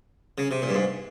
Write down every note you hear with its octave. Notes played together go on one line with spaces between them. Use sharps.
C#3
C3
A#2
G2
G#2